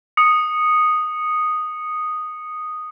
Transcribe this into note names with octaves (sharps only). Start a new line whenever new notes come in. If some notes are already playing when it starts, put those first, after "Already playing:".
D#6 C#7